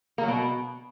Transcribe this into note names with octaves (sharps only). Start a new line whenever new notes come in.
A#3
F#3
B2